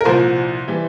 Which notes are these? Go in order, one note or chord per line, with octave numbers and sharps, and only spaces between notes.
A#4
C2 A#2 F3 C5
E3 G3